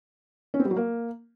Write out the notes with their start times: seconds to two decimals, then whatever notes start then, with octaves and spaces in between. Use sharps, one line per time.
0.54 C#4
0.60 C4
0.65 G3
0.71 F#3
0.77 A#3